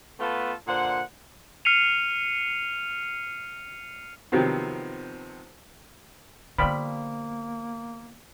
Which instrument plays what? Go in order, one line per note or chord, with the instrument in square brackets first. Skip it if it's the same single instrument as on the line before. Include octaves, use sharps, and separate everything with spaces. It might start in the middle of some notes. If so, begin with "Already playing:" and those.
[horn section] A3 B3 F4 A4 B4
A#2 D3 C5 F#5
[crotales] F6 C7 C#7 D#7 F7
[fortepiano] C3 D#3 F3 F#3 B3 C4
[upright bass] D3 B3 [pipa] F3 G3 [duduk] A#3 [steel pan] B5